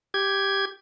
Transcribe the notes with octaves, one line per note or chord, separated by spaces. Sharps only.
G4 G#6